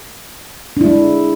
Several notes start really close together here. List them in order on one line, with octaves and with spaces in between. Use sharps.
D4 E4 G#3